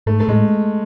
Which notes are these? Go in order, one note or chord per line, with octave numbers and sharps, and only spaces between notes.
G#2 A3
A3
A2 G#3